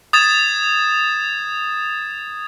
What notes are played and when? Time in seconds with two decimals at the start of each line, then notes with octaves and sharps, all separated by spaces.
0.13 D#6 G#6 A6 E7